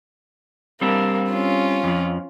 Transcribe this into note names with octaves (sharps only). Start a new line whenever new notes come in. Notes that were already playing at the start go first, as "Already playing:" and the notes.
G3 A#3 C4 D4
C#4 F4
F2 F3